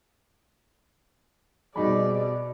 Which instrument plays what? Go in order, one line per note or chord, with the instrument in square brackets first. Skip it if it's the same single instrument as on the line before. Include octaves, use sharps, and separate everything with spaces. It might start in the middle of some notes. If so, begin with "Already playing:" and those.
[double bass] B2 [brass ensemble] G3 C4 G#4 [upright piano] D#4 F#4 B5 [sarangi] D5